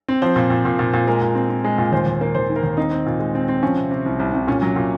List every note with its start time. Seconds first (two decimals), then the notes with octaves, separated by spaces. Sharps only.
0.08 C4
0.22 F3 C5
0.36 A#2
0.50 A#2
0.65 A#2
0.79 A#2
0.94 A#2
1.07 G#3 A#4
1.22 A#2
1.35 C4
1.49 C4
1.64 G#3
1.78 A#2
1.92 D#2 C5
2.06 D#2
2.21 A#3
2.35 D#2 C5
2.49 D#3
2.56 A#4
2.63 D#2
2.77 C4 D#4
2.91 C4
3.06 A#2
3.20 G#3
3.35 C4
3.49 C4
3.63 F3 C#4
3.76 C3
3.91 C3
4.06 C2
4.19 C2
4.33 C2
4.47 A#2 C#4
4.62 F#3
4.76 A#2